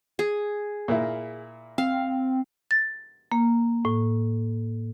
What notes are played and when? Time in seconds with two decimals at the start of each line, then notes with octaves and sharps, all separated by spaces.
0.19 G#4
0.88 A#2 A#3 E4
1.78 C4 F5
2.71 A6
3.32 A#3
3.85 A2